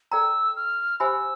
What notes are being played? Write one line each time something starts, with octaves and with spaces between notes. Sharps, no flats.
A4 D5 G5 A#5 E6
F6
G4 C5 E5 G#5 B5 E6